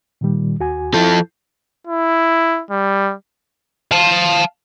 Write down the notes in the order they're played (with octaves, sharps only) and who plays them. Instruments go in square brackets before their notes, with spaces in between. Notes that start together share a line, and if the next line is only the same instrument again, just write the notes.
[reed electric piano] A#2 D#3 G3
D#2 F#4 G#5
[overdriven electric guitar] F3 A4 [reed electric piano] E4 G6
[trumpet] E4
G3
[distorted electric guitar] F5 A5